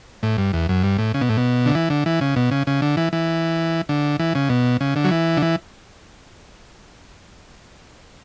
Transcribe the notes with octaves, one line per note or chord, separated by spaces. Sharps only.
A2
G2
E2
F#2
G2
A2
C#3
B2
A2
B2
D3
E3
D3
E3
C#3
B2
C#3
C#3
D3
E3
E3
D3
E3
C#3
B2
C#3
D3
F#3
E3
D3
E3